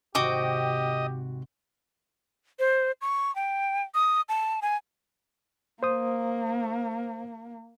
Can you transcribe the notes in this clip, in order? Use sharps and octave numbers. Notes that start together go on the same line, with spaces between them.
G#1 C3 F#4 G4 D#5 G5 D6
C5
C#6
G5
D#6
A5
G#5
A#3 C5 D#6